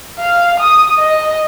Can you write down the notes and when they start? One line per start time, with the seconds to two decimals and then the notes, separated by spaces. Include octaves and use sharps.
0.19 F5
0.60 D#6
0.98 D#5